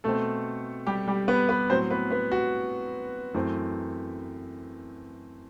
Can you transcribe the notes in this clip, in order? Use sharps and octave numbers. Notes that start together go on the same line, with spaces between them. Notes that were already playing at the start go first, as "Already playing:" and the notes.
B2 A3 C4 A4
G3 G4
G3 G4
B3 B4
B3 B4
A2 F#3 C4 C5
B3 B4
B3 B4
F#4
F#2 E3 A3 C4